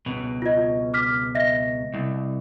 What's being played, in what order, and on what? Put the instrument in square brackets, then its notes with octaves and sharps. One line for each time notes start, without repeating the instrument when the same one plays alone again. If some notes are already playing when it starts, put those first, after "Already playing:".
[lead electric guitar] C#2 B2
[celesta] F4 D#5
D6 F6 B6
D#5 E5 A#6
[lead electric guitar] C2